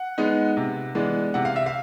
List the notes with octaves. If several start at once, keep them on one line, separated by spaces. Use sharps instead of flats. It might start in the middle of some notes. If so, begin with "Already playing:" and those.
Already playing: F#5
G#3 B3 D#4
C3
E3 G#3 B3 D4
C3 F#5
F5
E5
F5